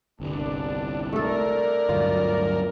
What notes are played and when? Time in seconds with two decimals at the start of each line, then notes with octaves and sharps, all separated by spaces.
0.20 G1 C2 G2 D4
1.13 A3 A4 A#4 D5
1.89 D2 G2 F#3 F4